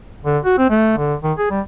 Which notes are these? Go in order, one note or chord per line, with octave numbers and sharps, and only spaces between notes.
D3
F#4
C4
A3
D3
D#3
G#4
G3